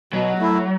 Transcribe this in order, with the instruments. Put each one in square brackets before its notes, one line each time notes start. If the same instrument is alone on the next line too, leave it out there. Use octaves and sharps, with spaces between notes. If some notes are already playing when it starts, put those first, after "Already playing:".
[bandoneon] B2 [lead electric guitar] F#3
[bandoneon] A3 E4